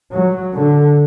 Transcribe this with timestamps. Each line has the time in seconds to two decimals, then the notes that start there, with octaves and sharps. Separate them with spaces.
0.12 F#3
0.55 D3